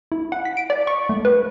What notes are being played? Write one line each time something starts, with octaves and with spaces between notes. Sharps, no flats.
E4
F#5
B6
D7
D5
C#6
A3
B4